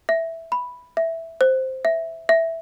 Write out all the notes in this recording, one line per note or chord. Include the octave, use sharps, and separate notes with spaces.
E5
B5
E5
C5
E5
E5